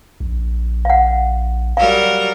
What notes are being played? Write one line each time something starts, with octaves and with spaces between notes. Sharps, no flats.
A#1
F5 F#5
F#3 G3 A#4 F5